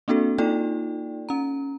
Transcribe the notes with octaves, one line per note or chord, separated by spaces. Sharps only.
A#3 C4 D4 F#4 A4
A#3 D#4 F4 A4 D5 G5
C#4 A#5